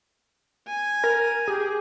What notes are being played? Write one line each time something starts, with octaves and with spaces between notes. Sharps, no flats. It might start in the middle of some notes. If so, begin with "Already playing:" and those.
G#5
A#4
G4 G#4